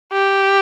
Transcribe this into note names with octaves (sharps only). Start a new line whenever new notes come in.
G4